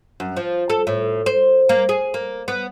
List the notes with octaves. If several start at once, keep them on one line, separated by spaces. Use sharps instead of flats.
F#2
F3
A4
A2
C5
A#3
G#4
A#3
B3